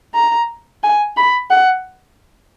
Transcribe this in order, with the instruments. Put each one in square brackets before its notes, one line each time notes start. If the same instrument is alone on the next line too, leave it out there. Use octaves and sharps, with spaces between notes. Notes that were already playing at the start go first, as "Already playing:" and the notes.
[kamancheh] A#5
G#5
B5
F#5